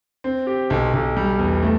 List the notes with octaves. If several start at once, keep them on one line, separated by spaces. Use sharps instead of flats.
C4
G4
B1
B1
G3
E2
A3